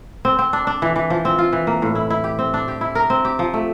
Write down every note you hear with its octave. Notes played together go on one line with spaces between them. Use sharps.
C4
C4
D4
D4
E3
E3
F3
C4
F4
E3
A#3
A2
E4
E4
G4
C4
D4
G4
E4
A#4
C4
G4
F3
A3